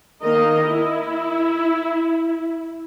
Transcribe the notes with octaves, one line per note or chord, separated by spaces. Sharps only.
D#3 A#3 A#4 D#5
E4